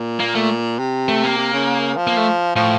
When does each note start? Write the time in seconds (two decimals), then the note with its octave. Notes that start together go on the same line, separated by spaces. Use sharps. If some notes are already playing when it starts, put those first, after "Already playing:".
Already playing: A#2
0.20 A#3
0.35 A3
0.79 C3
1.08 A3
1.23 A#3
1.38 C3
1.53 C#3
1.97 F3
2.07 A#3
2.17 A3
2.56 A2 F3